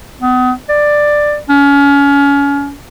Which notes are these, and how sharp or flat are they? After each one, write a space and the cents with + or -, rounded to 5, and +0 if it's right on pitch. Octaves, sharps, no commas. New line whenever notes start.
B3 +35
D5 +10
C#4 +30